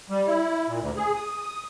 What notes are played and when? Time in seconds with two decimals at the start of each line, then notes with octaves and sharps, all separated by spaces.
0.10 G3
0.28 E4
0.68 A#2
0.80 D2
0.96 G#4
1.15 D#6